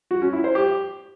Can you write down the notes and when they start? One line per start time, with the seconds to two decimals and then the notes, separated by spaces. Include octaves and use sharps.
0.11 F#4
0.22 C#4
0.33 E4
0.44 C5
0.55 G4